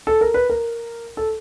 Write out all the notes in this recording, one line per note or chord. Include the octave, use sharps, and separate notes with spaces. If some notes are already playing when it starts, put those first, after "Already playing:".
A4
A#4
B4
A#4
A4